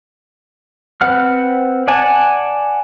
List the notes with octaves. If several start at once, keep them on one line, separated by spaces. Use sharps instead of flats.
C4 B4 F#5 F6
D5 F#5 G#5 A5